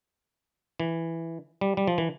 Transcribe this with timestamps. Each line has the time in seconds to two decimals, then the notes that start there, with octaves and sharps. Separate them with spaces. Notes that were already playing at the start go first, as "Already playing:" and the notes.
0.80 E3
1.61 G3
1.77 G3
1.87 F3
1.98 E3